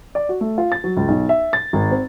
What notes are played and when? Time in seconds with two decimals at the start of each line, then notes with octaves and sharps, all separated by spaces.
0.15 D5
0.29 F#4
0.41 A3
0.58 F4
0.72 A6
0.84 F#3
0.97 C#2
1.08 B1
1.29 E5
1.53 A6
1.73 G#1
1.91 C4